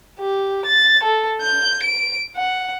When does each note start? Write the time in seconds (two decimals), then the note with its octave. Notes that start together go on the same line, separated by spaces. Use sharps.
0.19 G4
0.66 A6
1.03 A4
1.42 G6
1.83 D7
2.36 F#5